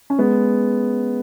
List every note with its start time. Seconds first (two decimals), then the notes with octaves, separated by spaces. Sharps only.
0.10 C#4
0.19 G#3 B3